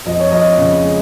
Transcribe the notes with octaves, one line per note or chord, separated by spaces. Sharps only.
F2 D#5
C#5
F2 D#5
C#3
G#3